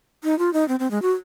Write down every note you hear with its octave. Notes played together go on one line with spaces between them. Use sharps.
D#4
F4
D#4
C4
C4
G#3
F#4